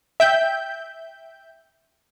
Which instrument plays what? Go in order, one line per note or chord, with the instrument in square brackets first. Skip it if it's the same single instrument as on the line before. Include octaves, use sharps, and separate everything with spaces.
[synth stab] E5 G5 G6